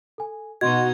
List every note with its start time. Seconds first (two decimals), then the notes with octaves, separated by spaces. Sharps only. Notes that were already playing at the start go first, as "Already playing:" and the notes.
0.18 A4 G#5
0.61 B2 D#4 F#4 D#5 C6 G#6